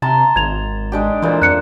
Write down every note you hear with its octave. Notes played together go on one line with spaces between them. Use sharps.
C3 A5 A#5 C6
G#1 G#6 F7
G#3 D4 G4
A#2 E3 C5
F2 F#6 C#7